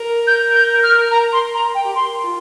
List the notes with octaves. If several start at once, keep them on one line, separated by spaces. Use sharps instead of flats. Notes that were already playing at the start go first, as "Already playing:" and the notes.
Already playing: A#4
G6
G6
F6
A#5
C6
A#5
G5
G4
A#4 C6
F4